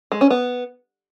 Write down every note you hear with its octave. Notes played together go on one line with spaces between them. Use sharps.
G#3
C#4
B3